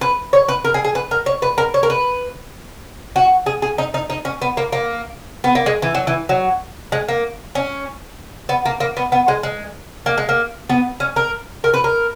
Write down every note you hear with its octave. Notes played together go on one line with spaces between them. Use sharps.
B4
C#5
B4
A#4
G#4
G#4
B4
A#4
C#5
B4
A#4
C#5
A#4
B4
F#4
G#4
G#4
D#4
D#4
D#4
C#4
B3
A#3
A#3
B3
A#3
G#3
E3
F#3
E3
F#3
G#3
A#3
C#4
B3
A#3
A#3
B3
B3
G#3
G#3
A#3
G#3
A#3
B3
C#4
A#4
A#4
B4
A#4